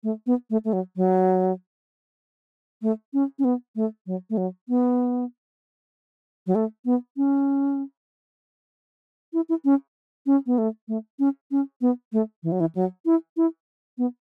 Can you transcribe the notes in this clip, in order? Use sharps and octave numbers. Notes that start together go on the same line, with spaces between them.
A3
B3
A3
A3
F#3
F#3
A3
C#4
C#4
B3
A3
F#3
A3
F#3
B3
F#3
A3
B3
C#4
E4
E4
C#4
C#4
B3
A3
A3
C#4
C#4
B3
A3
E3
F#3
E3
F#3
E4
E4
B3